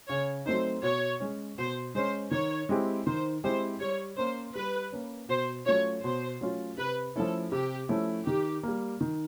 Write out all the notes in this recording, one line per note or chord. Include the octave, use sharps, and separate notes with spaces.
C#3 C#5
F#3 A3 C4 D#4 C5
B2 C#5
G#3 C#4
B2 C5
G#3 C#4 C5
D#3 C#5
G#3 C4 E4 G4
D#3 C5
G#3 C4 E4 G4 C5
G3 C#5
A#3 C#4 C5
G3 B4
A#3 C#4
B2 C5
F#3 A3 C#4 F4 C#5
B2 C5
F#3 A3 C#4 F4
C3 B4
F3 A3 C#4 E4 A4
C3 G4
F3 A3 C#4 E4
D#3 G4
G3 A#3
D#3